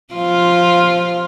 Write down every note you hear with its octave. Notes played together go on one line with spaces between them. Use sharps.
F3 F4